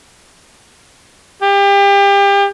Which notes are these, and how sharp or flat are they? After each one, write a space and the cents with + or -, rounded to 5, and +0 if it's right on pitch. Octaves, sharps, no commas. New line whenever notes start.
G4 +30